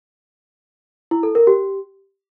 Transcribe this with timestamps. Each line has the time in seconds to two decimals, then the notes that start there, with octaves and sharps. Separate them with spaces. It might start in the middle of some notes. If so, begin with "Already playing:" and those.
1.11 E4
1.23 A4
1.35 A#4
1.47 G4